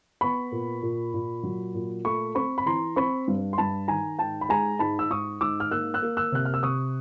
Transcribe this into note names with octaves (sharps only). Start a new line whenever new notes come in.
B3 B5 C#6
A#2
A#2
A#2
F#3
A#2
A3 B5 C#6
C4 B5 C#6
B5
E3 A#5 C6
C4 B5 C#6
G2
C6
G2 A5 B5
D#3 G#5 A#5
G#2 G5 A5
B5
G#3 G#5 A#5
G#2 A5 B5
E6
G#2 C#6 D#6
G#2 D6 E6
F6
A#3 E6 F#6
E6 F#6
A#3
E6 F#6
C3 F#6
F6
E6
C3 C#6 D#6